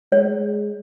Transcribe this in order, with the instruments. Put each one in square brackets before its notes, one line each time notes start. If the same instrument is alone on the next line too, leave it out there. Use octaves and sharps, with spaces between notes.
[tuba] G#3 [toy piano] C#5